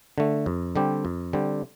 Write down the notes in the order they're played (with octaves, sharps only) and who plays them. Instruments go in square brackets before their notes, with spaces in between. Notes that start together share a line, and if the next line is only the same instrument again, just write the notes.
[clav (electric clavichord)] D3 A3
F2
D3 G3 C4 G4
F2
D3 G3 C4 G4